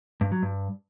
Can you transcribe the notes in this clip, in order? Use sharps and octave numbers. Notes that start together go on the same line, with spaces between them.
G2
F#3
G2